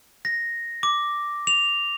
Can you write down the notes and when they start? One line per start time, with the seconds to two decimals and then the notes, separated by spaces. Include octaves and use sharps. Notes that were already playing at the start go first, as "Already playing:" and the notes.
0.25 A#6
0.83 D6
1.47 F7